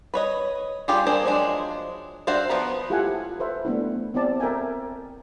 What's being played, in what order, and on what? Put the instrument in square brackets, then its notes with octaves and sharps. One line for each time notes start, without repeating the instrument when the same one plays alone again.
[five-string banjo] B4 C#5 D#5
G3 F4 G4 G#4
A#3 D4 G#4 C5
F3 F#3 G#3 D4
D4 F#4 C5 E5 F5
F3 B3 B4 A#5
[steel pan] E4 F4 G4 A4 F#5 G#5
A4 B4 C5 E5
A3 B3 D4 E4
B3 C4 E4 D5 A5
A4 A#4 E5 G5 G#5